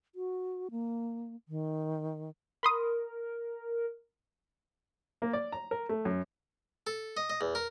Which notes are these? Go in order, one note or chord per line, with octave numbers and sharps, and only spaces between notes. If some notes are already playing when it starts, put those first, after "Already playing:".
F#4
A#3
D#3
A#4 B5 C6 D#6
A#3
D5
A#5
A#4
A3
F#2
A4
D#5
D#5
E2
A#4